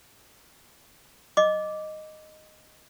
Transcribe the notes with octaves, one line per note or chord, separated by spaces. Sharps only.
D#5 D6